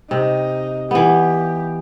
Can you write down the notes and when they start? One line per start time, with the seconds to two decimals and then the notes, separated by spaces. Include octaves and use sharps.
0.11 C3 D#4
0.91 E3 B3 G4